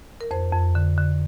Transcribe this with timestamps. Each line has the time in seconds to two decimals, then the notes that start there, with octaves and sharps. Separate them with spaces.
0.21 A#4
0.31 F2 C5
0.53 F2
0.75 D3
0.98 D3